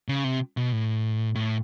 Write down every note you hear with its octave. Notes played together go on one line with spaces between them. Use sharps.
C#3
C3
B2
A2
A2